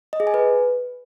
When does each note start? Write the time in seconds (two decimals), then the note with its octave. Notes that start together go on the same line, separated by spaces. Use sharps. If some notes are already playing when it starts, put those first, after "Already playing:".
0.13 D#5
0.20 G#4
0.27 G#5
0.34 B4